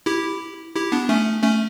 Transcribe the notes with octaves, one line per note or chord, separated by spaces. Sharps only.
E4 G4
E4 G4
B3 D4
A3 C#4
A3 C#4